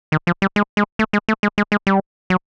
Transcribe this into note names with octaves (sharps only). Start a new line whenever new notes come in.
D#3
F3
G3
G#3
G#3
A3
G#3
A3
G#3
G#3
G#3
G3
F#3